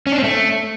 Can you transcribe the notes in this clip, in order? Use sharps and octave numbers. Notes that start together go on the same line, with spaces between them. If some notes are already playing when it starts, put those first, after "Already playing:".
C#4
D4
C4
A3